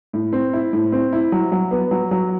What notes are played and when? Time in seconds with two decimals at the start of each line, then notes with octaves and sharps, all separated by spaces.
0.13 A2
0.33 C4
0.53 E4
0.73 A2
0.92 C4
1.13 E4
1.32 F#3
1.52 F#3
1.71 B3
1.91 F#3
2.11 F#3